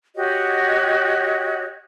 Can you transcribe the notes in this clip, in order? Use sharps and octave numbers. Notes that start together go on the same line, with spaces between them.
F#4 G4 C#5 D#5